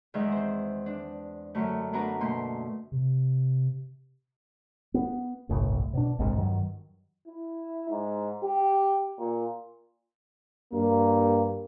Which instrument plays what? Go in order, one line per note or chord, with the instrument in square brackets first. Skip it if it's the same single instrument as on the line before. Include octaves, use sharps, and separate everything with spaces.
[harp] E2 D#3 G#3 E5 G#5
C4 C5
D4
F#2 D3 A3
A3 B3 D4 F#4 A#4 B4
B2 A3 A#3 C6
[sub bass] C3
[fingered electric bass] B3
G1 C2 A2
B2 D4
G1 C2 G#2 C3
G2 D#3 F#3
[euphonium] E4
G#2
G4
A#2
[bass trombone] G2 [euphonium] A#3